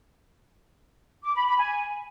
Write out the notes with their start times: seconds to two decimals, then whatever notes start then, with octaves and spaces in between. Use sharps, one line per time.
1.24 D6
1.35 B5
1.47 B5
1.58 G#5